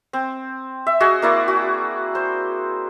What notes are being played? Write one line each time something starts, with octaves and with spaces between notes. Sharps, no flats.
C4
E5
F#4 G#4 D#5 G#5
A#3 E4 D5
F#4
C5